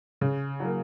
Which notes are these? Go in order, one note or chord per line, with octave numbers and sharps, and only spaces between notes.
C#3
F#3 A#3